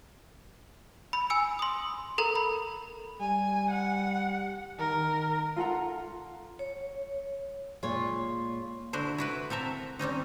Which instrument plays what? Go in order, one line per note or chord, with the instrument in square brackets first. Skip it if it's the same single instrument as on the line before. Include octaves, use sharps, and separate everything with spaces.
[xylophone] B5
G#5 E6 C#7
C6 D#6
A4 A#4 A#5
B5
[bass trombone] G3 [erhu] G#5
[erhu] F#5
[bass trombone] D#3 [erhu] A#4
[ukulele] F4 A4 F#5 A#5
[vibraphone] C#5
[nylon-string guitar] A#2 G#3 [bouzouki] F4 C#5
[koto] D3 E4 F#4 C5
E4 F#4 B4
C4 A4 A#4 E5
G3 C4 C#4 D#4